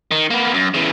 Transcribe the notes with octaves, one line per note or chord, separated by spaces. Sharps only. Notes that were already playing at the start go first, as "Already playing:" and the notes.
D#3
A#3 B3
F#2
C#3 E3